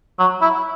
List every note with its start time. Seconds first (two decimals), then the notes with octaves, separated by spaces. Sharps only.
0.19 F#3
0.41 E4